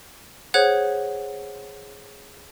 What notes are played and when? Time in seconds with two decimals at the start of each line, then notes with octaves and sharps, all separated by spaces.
0.54 G#4 C5 C#5 F#5 F#6 G#6